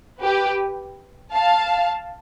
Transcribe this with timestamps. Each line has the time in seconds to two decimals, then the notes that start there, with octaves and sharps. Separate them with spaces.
0.21 G4 B4
1.34 F5 A5